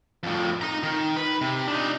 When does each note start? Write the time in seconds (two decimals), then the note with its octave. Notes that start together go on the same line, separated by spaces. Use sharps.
0.23 F2 A2
0.61 D#4 A#5
0.83 D#3
1.16 B4
1.41 C3
1.68 D4 D#4